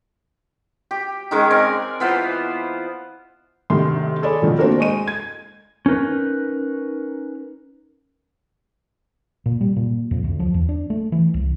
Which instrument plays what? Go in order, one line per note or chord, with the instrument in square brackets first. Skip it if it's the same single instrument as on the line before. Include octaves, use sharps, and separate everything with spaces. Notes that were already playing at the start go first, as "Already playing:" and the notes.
[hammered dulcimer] G4
D#3 G#3 C#4 D#4
C4 A#4 D5 G#5
E3 B3 F4 C5
[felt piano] D2 C3 D#3 C6
G#4 A4 C#5 D5 B5
F2 B2 D#3
A3 A#3 C4 D4 F#4 A#4
G#3 D#5 C#6 D#7
G#6
[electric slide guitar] C#4 D#4 A#4 B4
[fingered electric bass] A#2
G3
A#2
F2
D2
F3
E2
D4
A3
E3
C2